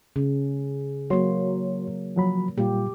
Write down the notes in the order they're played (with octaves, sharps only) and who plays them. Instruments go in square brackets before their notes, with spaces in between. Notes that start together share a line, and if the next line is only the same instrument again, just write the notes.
[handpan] C#3
[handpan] F#3 A#3 [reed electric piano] F#4 C#5 C6
[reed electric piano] F3 F#3 B5
[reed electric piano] A#2 G3 F4 [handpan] G4